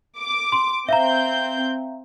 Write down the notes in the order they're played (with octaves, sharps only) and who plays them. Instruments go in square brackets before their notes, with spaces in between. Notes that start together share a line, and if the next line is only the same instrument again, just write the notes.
[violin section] D6
[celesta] C6
[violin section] C4 G6 [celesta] E5 F5 A#5